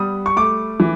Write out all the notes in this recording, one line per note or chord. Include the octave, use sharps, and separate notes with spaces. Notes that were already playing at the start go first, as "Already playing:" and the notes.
Already playing: G3 B3 D#6
C#6
A3 D6
E3